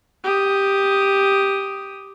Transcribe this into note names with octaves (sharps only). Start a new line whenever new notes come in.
G4 D#6